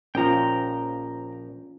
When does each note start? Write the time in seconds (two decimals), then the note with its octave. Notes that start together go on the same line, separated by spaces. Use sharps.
0.15 A#1 F3 C#4 F4 G5 A#5